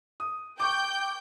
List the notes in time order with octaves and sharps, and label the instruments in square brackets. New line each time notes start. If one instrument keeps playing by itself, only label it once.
[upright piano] D#6
[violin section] G5 G6 [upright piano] C#6 D6